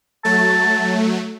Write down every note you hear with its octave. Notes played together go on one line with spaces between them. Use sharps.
F#3 A3 A5